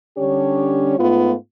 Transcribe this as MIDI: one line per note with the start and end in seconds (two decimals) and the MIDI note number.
0.17 0.99 50
0.17 0.99 55
0.17 0.99 61
0.17 0.99 62
0.17 0.99 67
0.17 0.99 73
0.99 1.34 44
0.99 1.34 57
0.99 1.34 59
0.99 1.34 65